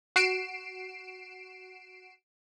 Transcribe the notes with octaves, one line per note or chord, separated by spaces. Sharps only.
F#4 C7 D7 E7